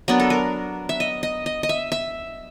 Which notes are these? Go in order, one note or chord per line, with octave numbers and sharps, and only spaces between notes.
F#3 B3 D4 A#4
A4
A#4
E5
D#5
D#5
D#5
D#5
E5
E5